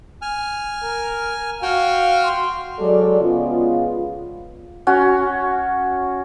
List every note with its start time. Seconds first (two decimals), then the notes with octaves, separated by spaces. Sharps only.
0.22 G#5 F6
0.83 A#4
1.63 F#4 F5 G5 F6
2.24 C6
2.79 F#3 G#3 F#4 A4 D5
3.20 C#3 G#3 B3 F4
4.87 C#4 F#4